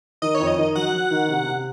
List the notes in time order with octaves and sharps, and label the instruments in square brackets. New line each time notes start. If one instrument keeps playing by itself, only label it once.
[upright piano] D#3 [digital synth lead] D#5
[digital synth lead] C#5
[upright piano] F2
[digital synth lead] D#5
[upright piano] D#3
[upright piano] F#3 [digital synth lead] F#5
[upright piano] F#3
D#3
C3
C3